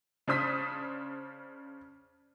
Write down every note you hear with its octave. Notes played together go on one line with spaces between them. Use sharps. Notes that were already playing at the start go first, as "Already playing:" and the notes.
C#3 D4 C5 D#6 B6